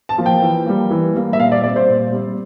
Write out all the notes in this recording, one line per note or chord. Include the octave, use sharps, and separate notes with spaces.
A5
F3 A#3 F4
G5
E3
G3 A#3
E3
G3 A#3
E5
A#2 F5
D5
G3 C4 D5
C5
A#2
G3 C4